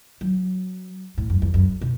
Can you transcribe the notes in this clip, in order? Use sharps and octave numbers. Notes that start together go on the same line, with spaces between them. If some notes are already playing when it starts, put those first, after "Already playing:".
F#3
A2
F#2
E2
F#2
B2